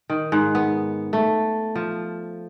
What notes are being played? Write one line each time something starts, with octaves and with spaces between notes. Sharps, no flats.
D#3
G#2
B3
A3
F3